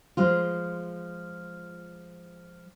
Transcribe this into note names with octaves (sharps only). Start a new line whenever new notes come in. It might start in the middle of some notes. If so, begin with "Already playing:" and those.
F3 G#3 F4